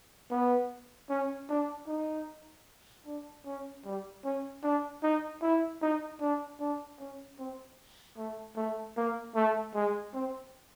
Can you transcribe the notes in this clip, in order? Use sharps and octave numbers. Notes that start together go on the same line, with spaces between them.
B3
C#4
D4
D#4
D4
C#4
G3
C#4
D4
D#4
E4
D#4
D4
D4
C#4
C4
A3
A3
A#3
A3
G#3
C4